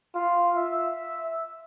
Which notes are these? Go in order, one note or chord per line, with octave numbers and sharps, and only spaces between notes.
F4
E5